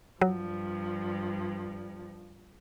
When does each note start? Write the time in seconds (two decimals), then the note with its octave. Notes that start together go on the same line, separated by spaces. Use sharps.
0.21 G2 F3 F#3